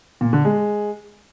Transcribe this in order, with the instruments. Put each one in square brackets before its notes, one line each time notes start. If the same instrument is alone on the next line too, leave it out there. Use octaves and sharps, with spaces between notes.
[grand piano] A#2
D3
G#3